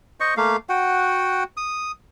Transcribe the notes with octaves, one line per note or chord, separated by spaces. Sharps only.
C5 D#5 C#6
A3 A#3 F5
F#4 F#5 G5
D#6